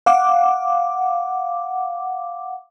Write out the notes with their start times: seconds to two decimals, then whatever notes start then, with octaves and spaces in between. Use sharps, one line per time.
0.06 F5 F#5 D6